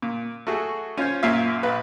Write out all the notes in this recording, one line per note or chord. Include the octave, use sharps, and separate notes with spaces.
A#2
A3 F#4 G#4
C#4 F4 C5 C#5
F#2 A#2 A#3 F4 E5 F5
A#1 B4